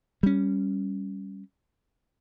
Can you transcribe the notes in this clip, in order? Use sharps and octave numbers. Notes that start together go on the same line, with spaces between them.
G3 C#4